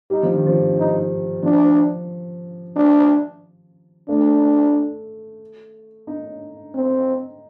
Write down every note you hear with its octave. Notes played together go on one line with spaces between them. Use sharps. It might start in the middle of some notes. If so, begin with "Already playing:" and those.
G3 D#4
F3
D#3
F3
D#4
F3 D4
D4
A3 D4
D#4
C4